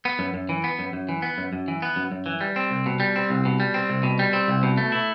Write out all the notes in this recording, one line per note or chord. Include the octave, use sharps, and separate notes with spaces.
B3
F#2
F#2
E3
B3
F#2
F#2
E3
B3
F#2
F#2
E3
B3
F#2
F#2
E3
G3
C4
C2
B2
G3
C4
C2
B2
G3
C4
C2
B2
G3
C4
C2
B2
A3
E4